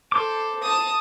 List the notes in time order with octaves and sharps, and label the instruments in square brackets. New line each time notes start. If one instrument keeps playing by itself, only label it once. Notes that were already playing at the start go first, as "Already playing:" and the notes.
[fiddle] A4 [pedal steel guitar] C5 D6
[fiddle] A5 D#6